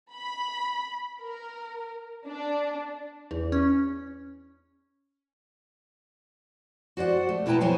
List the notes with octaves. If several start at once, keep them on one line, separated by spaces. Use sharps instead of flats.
B5
A#4
D4
E2
C#4
F#4 C5 D5 F#5
A3
B2 E4 B4 G5 A5 A#5
F#3 B3 C5 C#5 G#5